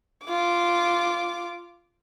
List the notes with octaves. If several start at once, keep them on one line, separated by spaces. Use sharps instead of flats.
F4 D6